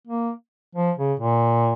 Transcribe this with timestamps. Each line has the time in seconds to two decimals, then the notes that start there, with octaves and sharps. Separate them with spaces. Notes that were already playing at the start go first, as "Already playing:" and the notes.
0.07 A#3
0.76 F3
0.98 C#3
1.20 A#2